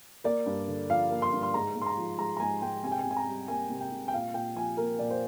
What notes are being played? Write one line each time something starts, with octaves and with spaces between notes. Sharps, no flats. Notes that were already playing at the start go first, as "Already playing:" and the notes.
A#3 D5
G2
D3
F3 F5
A#3
C6
G2
C6
G#2 A#5
G#2
C6
A#5
F3
G#3 A#5
A#5
G#2 G#5
G#2 G5
C3 G#5
G5
G#5
C3
G#5
A#5
G3
A#3 G#5
C3
G5
C3
G5
A#2 F5
A#2 G5
F3 G#5
A#3 A#4
A#2 D5
C5